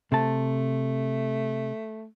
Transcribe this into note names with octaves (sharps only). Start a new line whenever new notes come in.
C3 A3 A5